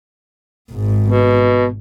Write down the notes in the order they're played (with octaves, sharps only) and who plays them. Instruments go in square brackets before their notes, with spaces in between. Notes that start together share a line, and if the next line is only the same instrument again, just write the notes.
[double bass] G#1 G#2
[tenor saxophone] B2